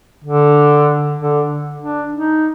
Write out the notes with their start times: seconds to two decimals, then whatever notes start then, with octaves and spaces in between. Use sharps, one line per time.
0.24 D3
1.19 D3
1.82 D4
2.14 D#4